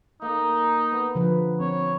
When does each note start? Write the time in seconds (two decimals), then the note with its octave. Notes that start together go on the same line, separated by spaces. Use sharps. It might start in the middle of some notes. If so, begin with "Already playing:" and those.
0.22 A#3 D#4
0.92 B3
1.15 D3 F3 B4
1.60 C4 C#5